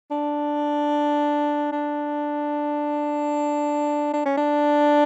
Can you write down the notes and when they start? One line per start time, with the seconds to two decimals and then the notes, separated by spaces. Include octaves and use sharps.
0.11 D4
1.72 D4
4.14 D4
4.25 C#4
4.37 D4